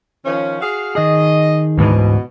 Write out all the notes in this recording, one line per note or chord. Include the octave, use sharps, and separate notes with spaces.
D#3 F3 C#4
F#4 G#4 F5
D#3 G#4 D#5
D2 G#2 B2 E3